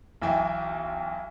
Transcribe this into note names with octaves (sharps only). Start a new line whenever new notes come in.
B1 E3 E5 G5 G#5